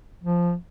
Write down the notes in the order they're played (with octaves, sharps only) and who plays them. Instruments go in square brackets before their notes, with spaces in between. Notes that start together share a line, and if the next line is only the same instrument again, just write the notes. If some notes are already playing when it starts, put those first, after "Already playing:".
[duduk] F3